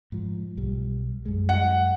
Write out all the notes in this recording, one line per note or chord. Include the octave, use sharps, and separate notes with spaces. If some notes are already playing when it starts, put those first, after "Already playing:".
G#2 F3
B1 G3
F#2 G3 G#3
F#5